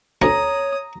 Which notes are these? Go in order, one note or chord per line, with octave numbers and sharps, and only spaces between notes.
D2 C#4 C#5 A#5 D#6